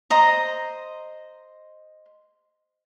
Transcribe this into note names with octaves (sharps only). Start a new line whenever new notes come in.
C5 D#5 A#5